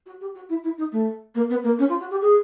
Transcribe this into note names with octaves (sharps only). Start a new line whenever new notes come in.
F#4
G4
F#4
E4
E4
D#4
A3
A#3
B3
A#3
C#4
F4
F#4
G4
G#4